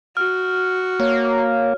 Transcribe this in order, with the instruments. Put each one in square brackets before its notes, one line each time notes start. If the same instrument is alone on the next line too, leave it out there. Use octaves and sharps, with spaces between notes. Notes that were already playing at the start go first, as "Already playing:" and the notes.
[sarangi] F#4 [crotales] F6
[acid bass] A#3 [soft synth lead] C#5